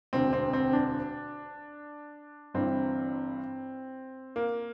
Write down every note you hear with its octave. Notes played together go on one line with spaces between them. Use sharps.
E1 D2 D3 C4
C4
C4
D4
G1 G2 E3 C4
A#3